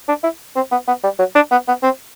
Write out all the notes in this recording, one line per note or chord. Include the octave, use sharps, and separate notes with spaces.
D4
E4
C4
B3
B3
G3
F#3
D4
B3
B3
C4